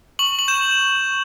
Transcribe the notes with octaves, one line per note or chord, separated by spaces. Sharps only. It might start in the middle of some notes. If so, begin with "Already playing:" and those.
C#6 F#7
F#7
G6 E7